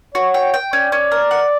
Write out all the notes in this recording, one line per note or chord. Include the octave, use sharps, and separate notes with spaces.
F#4 C#5
G5
G5
C#4 D5
C#4
A#4
F#5